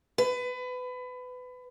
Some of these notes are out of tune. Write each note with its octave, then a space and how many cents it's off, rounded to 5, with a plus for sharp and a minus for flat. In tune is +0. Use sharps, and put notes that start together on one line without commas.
B4 +25